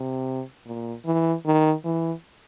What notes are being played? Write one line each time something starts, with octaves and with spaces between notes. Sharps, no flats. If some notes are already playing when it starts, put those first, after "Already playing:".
Already playing: C3
A#2
E3
D#3
E3